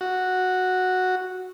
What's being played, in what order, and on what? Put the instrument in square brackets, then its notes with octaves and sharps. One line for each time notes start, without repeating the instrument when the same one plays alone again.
[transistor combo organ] F#4